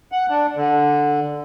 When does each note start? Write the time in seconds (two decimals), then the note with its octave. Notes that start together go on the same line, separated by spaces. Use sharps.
0.12 F#5
0.29 D4
0.56 D3